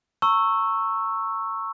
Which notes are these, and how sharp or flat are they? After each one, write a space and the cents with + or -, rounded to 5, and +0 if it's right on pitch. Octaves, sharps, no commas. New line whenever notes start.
A#5 -35 C#6 -10 E6 +5